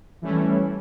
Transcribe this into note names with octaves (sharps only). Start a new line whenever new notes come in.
E3 G3 A3 C#4 E4